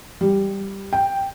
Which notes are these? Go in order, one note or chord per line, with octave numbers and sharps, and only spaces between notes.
G3
G5